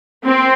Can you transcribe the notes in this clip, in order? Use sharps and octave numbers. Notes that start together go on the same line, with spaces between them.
C4